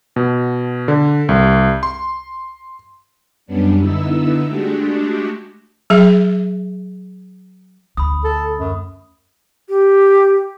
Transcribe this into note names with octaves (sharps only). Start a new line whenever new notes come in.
B2
D3
C2
C6
F#2 G3 B3 C#4 D4
D3 B3 D#4 E4 E6
G#3 A3 D4 F#4 G4
F#3 G#4 E5
D2 B5 D#6
A4
F#2
G4